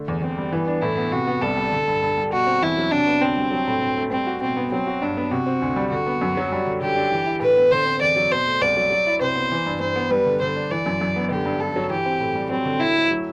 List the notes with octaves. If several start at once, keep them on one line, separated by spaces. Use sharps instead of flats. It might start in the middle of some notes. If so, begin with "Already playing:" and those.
Already playing: D3 A3
E2
E2 C4
G3
E3 B3
D4
A2 E4
B3
C3 F#4
B3
C2 A4
G3
D3
G2
G2
G3
B2 F#4
C4
E2 E4
F#3
C3 D4
B3
D2 C4
G3
F#3
A2
A2
A3
G3 C4
F#4
B2 C4
B3
F#3 C4
F#4
G2 D4
B3
C3 F#4
C4
D2
G3
D3 F#4
B3
F#2
F#3
G3
D3
D3 G4
D4
E3
E4
A2 B4
B3
D3 C5
C4
E2 D5
F#3
B2 C5
A3
C2 D5
F#3
F#3
E4
C3 C5
B3
E3
G2
G2 C5
B3
G3 B4
D3
D3 C5
D4
E3 D5
F#2
F#2
B3
D3 G4
G2
G2 A4
F#3
E3 G4
C4
A2
G3
F#3 C4
D3
D3 E4
A3
F#3